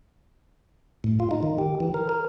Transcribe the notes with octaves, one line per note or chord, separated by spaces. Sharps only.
A2
F4
D#4
D#3
G4
E3
A#4
A#4